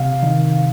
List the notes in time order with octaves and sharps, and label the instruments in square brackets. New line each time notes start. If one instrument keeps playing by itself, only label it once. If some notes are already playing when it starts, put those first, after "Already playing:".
Already playing: [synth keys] C3 F5
D#3